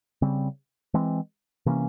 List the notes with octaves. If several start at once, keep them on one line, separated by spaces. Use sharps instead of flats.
C#3 G3 C4
E3 G#3 C4
C3 E3 A#3 C#4